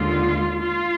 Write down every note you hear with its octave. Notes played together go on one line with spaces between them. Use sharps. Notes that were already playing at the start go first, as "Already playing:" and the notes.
Already playing: D#2 D3 G#3 F4
F4